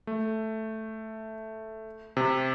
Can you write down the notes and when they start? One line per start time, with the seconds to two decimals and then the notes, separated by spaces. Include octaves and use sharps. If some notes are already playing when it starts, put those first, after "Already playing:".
0.07 A3
2.17 C3